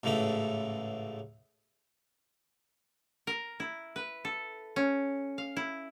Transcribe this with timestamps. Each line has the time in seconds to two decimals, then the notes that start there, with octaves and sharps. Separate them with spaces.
0.03 A1 G#2 C#3 E3 A3 B5
3.27 A#4
3.60 E4
3.96 B4
4.25 A4
4.76 C#4
5.38 F5
5.57 E4